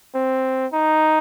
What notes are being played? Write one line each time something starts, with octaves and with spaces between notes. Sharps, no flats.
C4
D#4